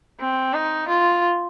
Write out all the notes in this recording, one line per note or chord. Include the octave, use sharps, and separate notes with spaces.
C4
D#4
F4